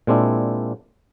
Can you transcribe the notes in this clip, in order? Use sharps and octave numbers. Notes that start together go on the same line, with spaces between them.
A#2 G#3 C4 D4 E4